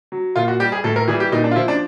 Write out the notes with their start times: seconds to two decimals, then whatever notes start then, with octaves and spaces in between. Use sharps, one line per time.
0.12 F#3
0.36 A#2 F4
0.48 F#4
0.60 G3 G4
0.72 G#4
0.84 A2 A4
0.96 A#4
1.08 E3 G3 G#4
1.20 G4
1.32 A#2 D#4
1.44 D4
1.51 F4
1.56 F3 E4
1.68 D4